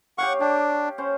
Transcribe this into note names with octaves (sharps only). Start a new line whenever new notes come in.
G4 C#5 F5 F#5 C#6
D4 G4
C#4 C5